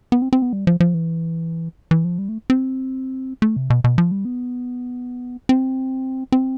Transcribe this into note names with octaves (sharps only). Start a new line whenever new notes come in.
B3
C4
C4
B3
G3
F3
F3
E3
E3
F3
G3
A3
C4
A3
C3
B2
B2
F3
G3
B3
C4
C4